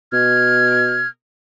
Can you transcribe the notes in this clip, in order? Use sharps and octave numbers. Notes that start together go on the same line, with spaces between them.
B2 F6 G#6